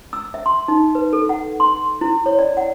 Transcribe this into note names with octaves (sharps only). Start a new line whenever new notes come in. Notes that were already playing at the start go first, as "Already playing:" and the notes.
E6
E5
C6
D#4
B4
A4
F#5
C6
E4
C#5
D5
F#5